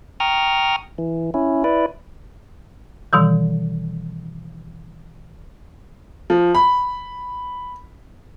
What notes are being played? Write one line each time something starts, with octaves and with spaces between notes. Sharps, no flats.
G5 A#5 C#6 D#6 F6
E3
C#4 E4
E4 B4 D5
B2 D#3 E3 G3
F3
B5